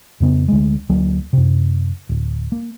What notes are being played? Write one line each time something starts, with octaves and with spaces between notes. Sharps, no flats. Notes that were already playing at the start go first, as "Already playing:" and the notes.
F2 C#3 B3
D2 G#3
D2 F#3 A#3
F#2 C3
D1
A#3